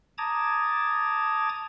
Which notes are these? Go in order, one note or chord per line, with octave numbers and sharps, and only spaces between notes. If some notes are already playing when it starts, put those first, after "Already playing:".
A5 A#5 D6 D#6 G#6 A6